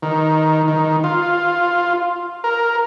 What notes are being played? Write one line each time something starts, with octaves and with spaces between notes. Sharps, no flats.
D#3
D#3
F4
A#4